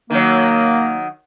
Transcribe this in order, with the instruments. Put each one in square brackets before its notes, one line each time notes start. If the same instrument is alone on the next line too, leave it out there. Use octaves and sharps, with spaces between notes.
[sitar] D#3 F#3 [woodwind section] A#3